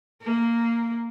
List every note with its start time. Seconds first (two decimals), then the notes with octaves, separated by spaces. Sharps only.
0.22 A#3